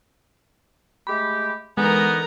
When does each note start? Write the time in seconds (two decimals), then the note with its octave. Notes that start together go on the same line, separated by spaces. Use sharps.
1.07 G#3 A3 G4 B5
1.77 D3 E3 G#3 B3 D#4 A#4 A#5